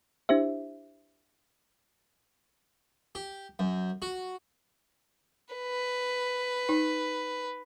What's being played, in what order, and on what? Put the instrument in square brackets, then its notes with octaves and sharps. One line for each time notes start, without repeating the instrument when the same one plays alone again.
[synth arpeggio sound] D4 E4 G4 C5 E5
[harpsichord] G4
F#2
F#4
[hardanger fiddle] B4
[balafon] D#4